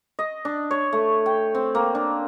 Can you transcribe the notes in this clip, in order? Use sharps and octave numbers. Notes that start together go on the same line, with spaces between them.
D#5
D4
C#5
A3
G5
C4
A#3
D4